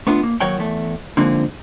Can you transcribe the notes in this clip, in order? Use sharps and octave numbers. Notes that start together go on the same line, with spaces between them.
A3 B3 D4 F4
A#3
D#2 F#3 A#4 C#5 F#5 G5
E2 A3
D3 F3 G#3 A#3 C4 D#4